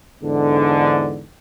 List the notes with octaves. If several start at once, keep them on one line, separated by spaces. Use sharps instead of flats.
E2 G#2 D3